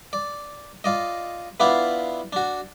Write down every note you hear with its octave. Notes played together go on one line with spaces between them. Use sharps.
D5
F4 D5 D#5
B3 D4 E4 F4 D5 F5
D4 F#4